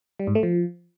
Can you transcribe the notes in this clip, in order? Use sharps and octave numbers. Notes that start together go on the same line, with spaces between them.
G3
G#2
A3
F3